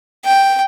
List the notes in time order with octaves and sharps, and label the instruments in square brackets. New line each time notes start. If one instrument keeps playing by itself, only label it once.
[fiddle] G5